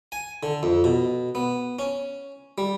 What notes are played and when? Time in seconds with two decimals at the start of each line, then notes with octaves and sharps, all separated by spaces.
0.12 G#5
0.43 D3
0.63 F2
0.84 B2
1.35 B3
1.79 C#4
2.58 G3